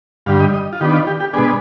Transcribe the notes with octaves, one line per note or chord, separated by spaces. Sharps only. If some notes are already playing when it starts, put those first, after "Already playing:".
G2 D3 G3 F5
D#5
D#5
F4
D#3 B3 D4 G4
F4
G4
G4
B2 G#3 B3 D4 G#4